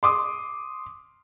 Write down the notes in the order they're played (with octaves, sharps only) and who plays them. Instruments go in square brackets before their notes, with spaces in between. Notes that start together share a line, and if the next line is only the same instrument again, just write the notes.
[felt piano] C6 D6 D#6